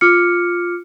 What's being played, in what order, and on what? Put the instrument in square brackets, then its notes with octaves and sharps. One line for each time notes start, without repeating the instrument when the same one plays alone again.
[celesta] F4 D6 F6 C#7